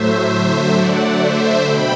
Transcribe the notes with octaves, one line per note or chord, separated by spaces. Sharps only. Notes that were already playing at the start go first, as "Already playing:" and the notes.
Already playing: A2 F#3 A3 C5 E5
D3 F#3 A3
D3 F#3 A3 D5 F#5
D3 A3 C5 E5
B2 G5 B5